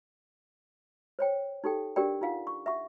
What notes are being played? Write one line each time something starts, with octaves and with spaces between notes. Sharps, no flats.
C5 C#5 G5
D#4 G4 A4 G5
D4 G4 A#4 D5 G5
D#4 F4 F5 F#5
C#6
E5 F#5 C#6